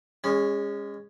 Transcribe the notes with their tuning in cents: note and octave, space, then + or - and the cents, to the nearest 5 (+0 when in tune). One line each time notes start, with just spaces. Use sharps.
G#3 -25 C#4 +0